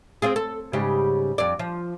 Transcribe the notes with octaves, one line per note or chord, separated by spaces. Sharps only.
C4 F4 G#4
A4
G#2 C#3 G3
F2 D5
F3